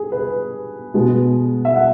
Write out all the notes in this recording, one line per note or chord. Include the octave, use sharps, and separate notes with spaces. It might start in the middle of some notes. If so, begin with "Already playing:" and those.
Already playing: G#4
B4
B2 G#3 B3
E5
F#5